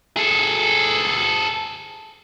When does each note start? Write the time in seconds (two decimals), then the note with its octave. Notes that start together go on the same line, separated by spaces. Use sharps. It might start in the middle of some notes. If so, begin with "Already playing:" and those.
0.17 G#4 A4